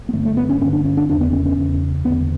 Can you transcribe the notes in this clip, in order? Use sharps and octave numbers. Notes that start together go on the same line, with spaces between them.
B3
G2 D3 A3
A3
B3
C#4
G2 D3 C#4
D4
C#4
D4
E2 C#3 D4
B3
C#4
C#4
E2 C#3
E2 D3 B3